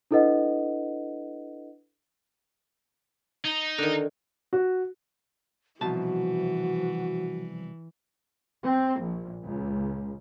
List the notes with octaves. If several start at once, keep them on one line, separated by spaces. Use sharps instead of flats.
D4 E4 A4 B4 D#5 F#5
D#4
D3 D#3
F#4
C2 B2 E3 F3 F#4 A5
C4
A#1
C#2